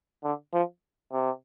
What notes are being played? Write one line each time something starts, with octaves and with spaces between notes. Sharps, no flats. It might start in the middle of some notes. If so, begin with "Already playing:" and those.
D3
F3
C3